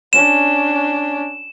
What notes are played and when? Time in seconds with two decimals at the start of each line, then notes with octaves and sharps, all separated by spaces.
0.13 C#4 D4 E7